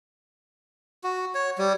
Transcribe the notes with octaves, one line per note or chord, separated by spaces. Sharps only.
F#4
C#5
G3